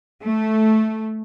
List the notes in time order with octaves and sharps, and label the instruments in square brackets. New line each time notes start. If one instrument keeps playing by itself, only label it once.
[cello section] A3